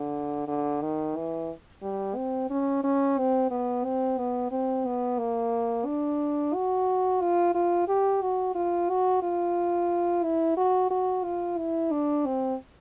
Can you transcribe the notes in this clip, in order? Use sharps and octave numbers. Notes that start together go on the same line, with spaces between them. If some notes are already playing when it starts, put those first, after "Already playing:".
Already playing: D3
D3
D#3
E3
G3
C4
C#4
C#4
C4
B3
C4
B3
C4
B3
A#3
D4
F#4
F4
F4
G4
F#4
F4
F#4
F4
E4
F#4
F#4
F4
E4
D4
C4